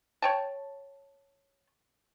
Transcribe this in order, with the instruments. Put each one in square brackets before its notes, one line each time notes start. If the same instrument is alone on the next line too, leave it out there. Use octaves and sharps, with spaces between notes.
[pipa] C#5 G5 A5